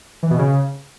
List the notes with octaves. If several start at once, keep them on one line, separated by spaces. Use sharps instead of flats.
E3
B2
C#3